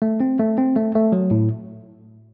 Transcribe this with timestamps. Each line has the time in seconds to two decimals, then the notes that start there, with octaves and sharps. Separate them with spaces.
0.02 A3
0.20 C4
0.39 A3
0.58 C4
0.76 A3
0.95 A3
1.12 F#3
1.31 A2